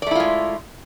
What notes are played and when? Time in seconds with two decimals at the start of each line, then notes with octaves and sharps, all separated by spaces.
0.02 D5
0.07 A3
0.11 E4
0.15 F4
0.20 G#3